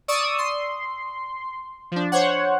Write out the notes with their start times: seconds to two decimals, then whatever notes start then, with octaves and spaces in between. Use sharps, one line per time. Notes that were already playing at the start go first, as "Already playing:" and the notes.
0.08 D5 C#6 D#6 E6
0.38 C6
1.92 F3 D4
2.12 C5 C#5 F#5